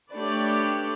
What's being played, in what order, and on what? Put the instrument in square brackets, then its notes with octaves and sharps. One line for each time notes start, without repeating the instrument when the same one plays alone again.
[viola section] A3 D4 G4 B4 C#5 D5